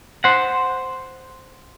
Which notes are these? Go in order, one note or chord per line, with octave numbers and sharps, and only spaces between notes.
C5 F#5